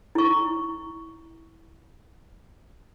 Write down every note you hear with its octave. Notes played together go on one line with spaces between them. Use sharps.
E4 C#6